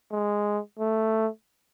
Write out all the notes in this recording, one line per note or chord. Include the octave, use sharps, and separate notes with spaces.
G#3
A3